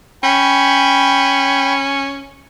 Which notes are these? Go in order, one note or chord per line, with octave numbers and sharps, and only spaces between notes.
C#4 G5 B5